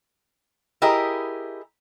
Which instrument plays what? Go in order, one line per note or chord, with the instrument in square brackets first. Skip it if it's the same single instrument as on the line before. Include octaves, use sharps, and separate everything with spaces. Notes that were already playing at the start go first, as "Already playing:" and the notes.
[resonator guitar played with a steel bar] E4 G4 G#4 A#4 D#5